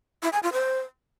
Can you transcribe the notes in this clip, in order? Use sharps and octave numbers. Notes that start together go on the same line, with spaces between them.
E4
G#5
F4
C5